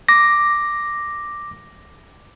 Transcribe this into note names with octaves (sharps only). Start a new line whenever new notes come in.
D6 A#6